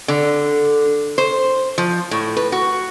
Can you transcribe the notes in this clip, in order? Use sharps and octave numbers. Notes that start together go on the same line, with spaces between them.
D3
C5
F3
A2
B4
F#4